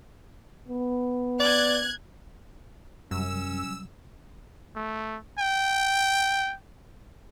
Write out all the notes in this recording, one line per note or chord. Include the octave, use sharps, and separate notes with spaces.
B3
D5 F#6 G#6
F#2 C3 F#3 G3 C#4 E6
A3
G5